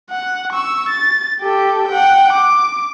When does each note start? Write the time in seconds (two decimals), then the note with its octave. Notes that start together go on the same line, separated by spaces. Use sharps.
0.10 F#5
0.53 C#6 E6
0.89 A6
1.41 G4 A4
1.88 F#5 G5
2.33 D6